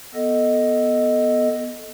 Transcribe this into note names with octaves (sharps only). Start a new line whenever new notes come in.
B3 A4 D#5